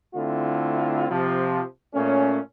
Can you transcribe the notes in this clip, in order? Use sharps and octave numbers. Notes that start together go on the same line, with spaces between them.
D3 A3 C4 E4 F4
C3 F3
A#2 A3 C#4